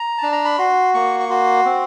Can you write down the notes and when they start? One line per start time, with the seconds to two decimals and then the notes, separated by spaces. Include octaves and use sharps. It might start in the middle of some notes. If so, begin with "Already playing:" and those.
Already playing: A#5
0.18 D4 A5
0.32 A#5
0.45 B5
0.58 F#4 C6
0.94 A#3 C#6
1.20 C#6
1.30 F#4 C6
1.65 C4